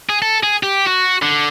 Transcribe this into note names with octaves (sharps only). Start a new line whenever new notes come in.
G#4
A4
G#4
G4
F#4
D3